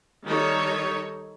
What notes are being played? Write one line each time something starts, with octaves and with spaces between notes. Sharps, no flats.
D#3 G3 D#4 A4 C#5